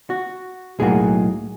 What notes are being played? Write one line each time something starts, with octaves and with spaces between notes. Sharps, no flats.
F#4
B1 A2 F#3 A#3 G#4